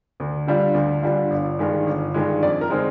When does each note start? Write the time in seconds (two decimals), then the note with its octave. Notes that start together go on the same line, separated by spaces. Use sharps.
0.20 D2
0.47 D3 G3 D4 F4
0.74 D2
1.03 D3 G3 D4 F4
1.30 G1
1.59 G2 D#3 G#3
1.87 G1
2.14 G2 D#3 G#3
2.42 F2 D5
2.61 A#4
2.70 D3 G#3 C4 D#4